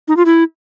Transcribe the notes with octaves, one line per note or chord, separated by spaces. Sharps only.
D#4
F4
E4